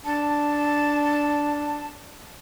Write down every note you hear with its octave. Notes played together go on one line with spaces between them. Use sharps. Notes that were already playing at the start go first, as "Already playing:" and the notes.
D4 A5